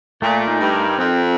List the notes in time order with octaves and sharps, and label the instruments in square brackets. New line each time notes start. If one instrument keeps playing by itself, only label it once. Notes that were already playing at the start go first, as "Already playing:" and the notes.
[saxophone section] A#2 [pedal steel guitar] A3
[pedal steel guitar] D#4
[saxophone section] G2
[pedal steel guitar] A#4
[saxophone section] F2 [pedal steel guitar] C4